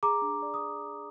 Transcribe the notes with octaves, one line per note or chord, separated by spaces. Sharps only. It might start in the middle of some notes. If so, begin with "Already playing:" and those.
G#4 A#5 D6
D4
D5
D#6